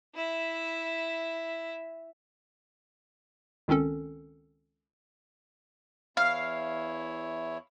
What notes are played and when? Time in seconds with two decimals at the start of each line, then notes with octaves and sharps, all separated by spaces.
0.15 E4 E5
3.68 C#2 D#3 C4 C#4 A4
6.17 E2 E4 C#5 F5